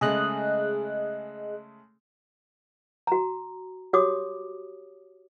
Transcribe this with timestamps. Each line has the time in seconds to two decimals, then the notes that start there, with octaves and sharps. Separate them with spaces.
0.01 C#3 G#3 A3 G#4 D#5 F#6
3.07 F#4 A#5
3.93 F#4 G4 C#5 D6 D#6